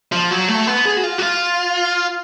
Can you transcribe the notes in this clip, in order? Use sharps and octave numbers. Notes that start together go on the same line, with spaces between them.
F3
F#3
A3
B3
G#4
F#4
F4
F#4
F4